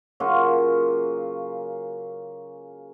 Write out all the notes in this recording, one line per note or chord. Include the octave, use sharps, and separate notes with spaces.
C#3 F#3 A#3 F4